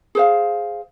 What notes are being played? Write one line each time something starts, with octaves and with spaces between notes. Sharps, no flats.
G#4 C5 F5